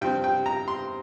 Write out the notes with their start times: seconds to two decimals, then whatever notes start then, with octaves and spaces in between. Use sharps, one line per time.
0.01 G2 F3 C4 G5
0.24 G5
0.46 A#5
0.68 C6